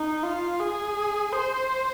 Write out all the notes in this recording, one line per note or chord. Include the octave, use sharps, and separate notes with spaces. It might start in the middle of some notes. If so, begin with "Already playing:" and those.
Already playing: D#4
F4
G#4
C5